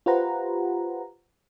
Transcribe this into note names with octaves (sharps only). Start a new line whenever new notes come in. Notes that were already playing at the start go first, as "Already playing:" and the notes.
F4 G4 B4 C5 F#5 A#5